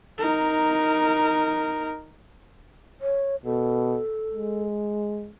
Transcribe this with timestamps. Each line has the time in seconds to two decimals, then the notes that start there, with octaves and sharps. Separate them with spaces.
0.19 D#4 A#4
3.01 C#5
3.45 B2 A4
4.34 G#3